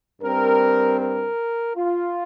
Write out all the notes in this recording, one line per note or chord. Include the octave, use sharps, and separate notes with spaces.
G2 G3 C4 A#4
A#4
F4